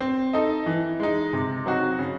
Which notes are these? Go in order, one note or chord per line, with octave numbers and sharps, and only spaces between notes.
C4
D#4 A4 D#5
E3
G#3 D#4
C3
F#3 C4 D#4 F#4
C#3